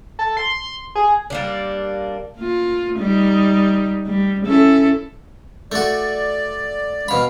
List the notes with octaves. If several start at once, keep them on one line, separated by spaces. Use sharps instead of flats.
A4
C6
G#4
G3 A#3 D4
A#3 F4
G3 D#4
G3
C#4 E4 A4
A3 F#4 D5
B2 F5 B5 F6